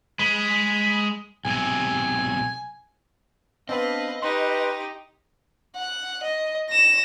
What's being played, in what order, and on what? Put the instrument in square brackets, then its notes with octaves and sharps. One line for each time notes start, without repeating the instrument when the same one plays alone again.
[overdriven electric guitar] G#3 [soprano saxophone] B5
[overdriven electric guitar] B1 C3 [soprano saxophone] G#5
[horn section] B3 C4 F5 [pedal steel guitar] D4 [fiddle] B4 [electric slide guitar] D#5
[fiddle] D#4 G4 [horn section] B4 [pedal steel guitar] C6
[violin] F#5
D#5
A#6 E7